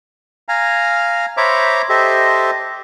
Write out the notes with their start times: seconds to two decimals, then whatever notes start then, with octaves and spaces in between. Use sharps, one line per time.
0.49 F5 G#5 A#5
1.37 C5 C#5 E5 A#5 B5 D6
1.89 G4 A4 C5 D#5 E5